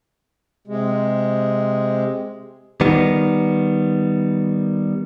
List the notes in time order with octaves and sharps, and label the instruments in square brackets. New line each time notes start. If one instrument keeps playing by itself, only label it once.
[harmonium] C3 G#3
[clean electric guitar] D#3 G3 B3